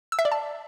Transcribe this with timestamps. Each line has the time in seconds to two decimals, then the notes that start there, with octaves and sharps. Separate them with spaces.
0.12 E6
0.19 E5
0.25 D5
0.32 A5